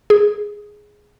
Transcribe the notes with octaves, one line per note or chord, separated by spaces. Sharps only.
G#4